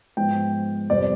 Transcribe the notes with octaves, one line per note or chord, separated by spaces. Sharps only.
G#2 F3 B3 G5
F2 C3 G3 B3 D5